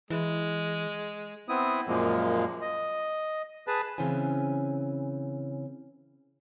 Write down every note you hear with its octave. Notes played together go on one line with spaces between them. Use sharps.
E3 G#3
B3 C4 E4 D#6
F#2 A#2 F3 G#3 A#3
D#5
G#4 B4 A5
C#3 E3 C4 C#4 G#5